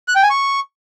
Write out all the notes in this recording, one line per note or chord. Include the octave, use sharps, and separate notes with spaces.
F#6
G5
G#5
C#6